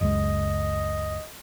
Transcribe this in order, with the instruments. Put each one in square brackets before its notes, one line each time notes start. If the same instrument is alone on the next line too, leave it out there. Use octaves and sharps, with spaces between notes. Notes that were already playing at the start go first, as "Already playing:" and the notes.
[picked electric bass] F#1 C#2 G#3 [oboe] D#5